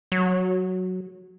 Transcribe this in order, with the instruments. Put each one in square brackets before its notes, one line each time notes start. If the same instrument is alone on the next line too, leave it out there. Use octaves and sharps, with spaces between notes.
[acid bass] F#3